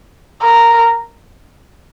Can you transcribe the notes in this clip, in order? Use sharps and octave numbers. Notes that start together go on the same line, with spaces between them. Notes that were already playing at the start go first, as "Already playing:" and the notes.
A#4